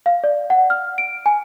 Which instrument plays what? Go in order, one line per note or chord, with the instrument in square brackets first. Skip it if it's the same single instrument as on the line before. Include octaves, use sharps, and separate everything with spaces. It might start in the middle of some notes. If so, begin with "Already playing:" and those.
[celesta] F5
D5
F#5
F6
D7
G#5